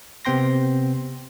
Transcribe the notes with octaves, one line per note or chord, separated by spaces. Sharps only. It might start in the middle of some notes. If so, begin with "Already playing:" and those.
C3 B3 C4 G5 C6 A#6